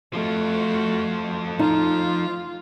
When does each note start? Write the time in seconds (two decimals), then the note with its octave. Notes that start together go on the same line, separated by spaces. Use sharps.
0.13 F3 A3 F4 F#4 A4
1.59 D#4 F4